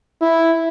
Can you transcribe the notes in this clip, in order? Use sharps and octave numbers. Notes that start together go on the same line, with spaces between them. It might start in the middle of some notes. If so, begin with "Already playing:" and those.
E4